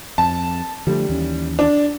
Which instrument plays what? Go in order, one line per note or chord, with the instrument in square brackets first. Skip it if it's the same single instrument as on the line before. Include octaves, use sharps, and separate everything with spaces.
[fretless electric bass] F2 [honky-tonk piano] A5
[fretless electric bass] D3 F3 A3 [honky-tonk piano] G3
[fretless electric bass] D#2 E3 C#4
[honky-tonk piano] D4